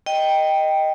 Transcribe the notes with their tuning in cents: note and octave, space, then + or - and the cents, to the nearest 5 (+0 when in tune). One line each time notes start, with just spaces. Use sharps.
D#5 +0 G5 +0